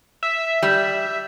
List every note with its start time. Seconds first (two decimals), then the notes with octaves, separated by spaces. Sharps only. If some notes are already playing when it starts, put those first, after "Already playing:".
0.23 E5
0.63 G3